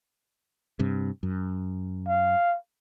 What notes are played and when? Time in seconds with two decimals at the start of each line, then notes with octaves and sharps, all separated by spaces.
0.79 G2 C3
1.23 F#2
2.08 F5